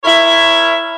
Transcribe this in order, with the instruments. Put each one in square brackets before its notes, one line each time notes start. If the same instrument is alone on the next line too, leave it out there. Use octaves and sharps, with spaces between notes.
[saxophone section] E4 A#4 C#5 E5